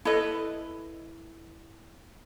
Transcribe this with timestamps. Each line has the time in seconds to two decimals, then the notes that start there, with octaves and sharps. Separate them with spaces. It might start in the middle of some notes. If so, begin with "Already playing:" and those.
0.05 E4 A4 B4 D#5